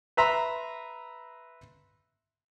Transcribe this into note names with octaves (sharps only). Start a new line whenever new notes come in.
B4 E5 A#5 C6